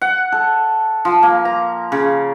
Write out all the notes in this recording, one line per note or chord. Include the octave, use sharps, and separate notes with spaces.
F#5
A4
F3
A#3
A#5
C#3